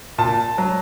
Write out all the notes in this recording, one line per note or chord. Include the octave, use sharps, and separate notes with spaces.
A#2 A5
F#3